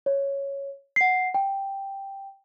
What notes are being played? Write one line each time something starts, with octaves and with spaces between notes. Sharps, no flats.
C#5
F#5 C7
G5